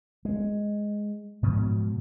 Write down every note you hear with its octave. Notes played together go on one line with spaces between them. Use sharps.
G#3
G#2 B2 F3 F#3